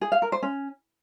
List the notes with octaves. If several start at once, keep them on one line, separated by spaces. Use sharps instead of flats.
G#4
F5
A#4
C5
C#4